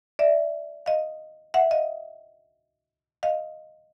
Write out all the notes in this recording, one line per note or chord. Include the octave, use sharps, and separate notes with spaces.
D5 E5
D#5 F5
E5 F#5
D#5 F5
D#5 F5